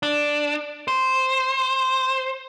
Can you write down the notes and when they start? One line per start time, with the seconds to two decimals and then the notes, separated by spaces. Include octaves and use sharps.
0.03 D4
0.88 C5